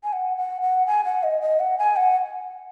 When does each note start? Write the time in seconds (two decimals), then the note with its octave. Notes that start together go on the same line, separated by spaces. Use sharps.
0.04 G#5
0.13 F#5
0.37 F#5
0.62 F#5
0.87 G#5
1.05 F#5
1.23 D#5
1.42 D#5
1.60 F#5
1.78 G#5
1.96 F#5